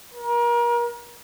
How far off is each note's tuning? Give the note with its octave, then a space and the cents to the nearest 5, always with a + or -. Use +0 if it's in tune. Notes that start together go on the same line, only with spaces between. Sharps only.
A#4 +35